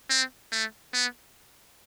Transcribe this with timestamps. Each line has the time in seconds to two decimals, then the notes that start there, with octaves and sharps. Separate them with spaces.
0.10 C4
0.52 A3
0.93 B3